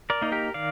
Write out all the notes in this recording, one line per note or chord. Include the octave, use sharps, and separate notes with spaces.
A#4 D5
A#3 D#4
G4 A#4
D#3 D5 F5